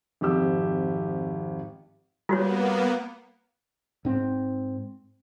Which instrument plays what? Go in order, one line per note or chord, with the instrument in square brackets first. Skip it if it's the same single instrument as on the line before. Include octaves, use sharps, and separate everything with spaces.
[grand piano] G#1 F2 G4 E6
[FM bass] G3 [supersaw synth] A#3 B3 [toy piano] F4 F#4 C#5
[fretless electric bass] G#2 C4